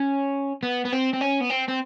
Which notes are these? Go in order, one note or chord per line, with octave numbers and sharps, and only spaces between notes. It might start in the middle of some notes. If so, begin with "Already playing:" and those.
Already playing: C#4
B3
B3
C4
C4
C#4
B3
C4
C4